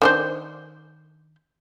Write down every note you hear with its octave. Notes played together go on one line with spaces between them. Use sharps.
D#3 D4 C5